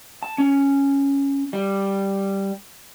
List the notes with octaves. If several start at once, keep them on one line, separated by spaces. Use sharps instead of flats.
A5
C#4
G3